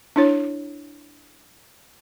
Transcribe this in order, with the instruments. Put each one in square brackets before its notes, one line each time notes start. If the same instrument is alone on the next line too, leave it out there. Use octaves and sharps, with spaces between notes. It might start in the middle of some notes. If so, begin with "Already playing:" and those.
[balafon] D4 E4 C#5